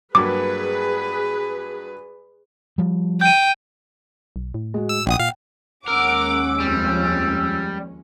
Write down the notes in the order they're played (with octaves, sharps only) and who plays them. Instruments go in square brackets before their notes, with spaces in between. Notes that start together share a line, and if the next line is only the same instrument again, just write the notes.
[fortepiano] G2 F#3 A#3 [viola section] G#4 B4 [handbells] D6
[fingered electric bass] F3 G3
[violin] G5 [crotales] G6 D#7
[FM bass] B1
A2
[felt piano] G#3 F#4
[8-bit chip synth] E6
[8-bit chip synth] A#1 D#6 [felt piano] F#5 G5
[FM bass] A#2 [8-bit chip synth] F5
[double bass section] D#2 G#3 C#4 [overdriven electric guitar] A#4 [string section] F#5 D6 [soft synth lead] E6
[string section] F2 [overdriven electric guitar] G3